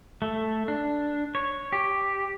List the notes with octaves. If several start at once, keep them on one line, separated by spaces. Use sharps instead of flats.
A3
D4
C#5
G4